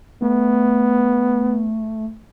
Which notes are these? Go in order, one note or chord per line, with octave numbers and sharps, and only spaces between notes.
A3 B3